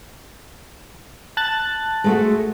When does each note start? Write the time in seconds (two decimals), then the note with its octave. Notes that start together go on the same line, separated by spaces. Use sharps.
1.37 A5 F#6 A6
2.04 G#3 A3 F#4